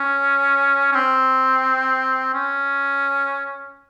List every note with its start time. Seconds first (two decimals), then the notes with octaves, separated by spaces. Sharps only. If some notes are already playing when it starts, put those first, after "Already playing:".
Already playing: C#4
0.92 C#4
0.95 C4
2.34 C#4